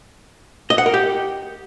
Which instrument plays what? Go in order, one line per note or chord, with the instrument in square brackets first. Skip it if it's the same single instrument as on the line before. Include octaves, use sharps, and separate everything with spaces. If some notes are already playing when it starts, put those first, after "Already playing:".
[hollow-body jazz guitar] D#5
F#5
A#4
G4